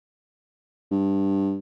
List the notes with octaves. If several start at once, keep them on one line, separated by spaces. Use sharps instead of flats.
G2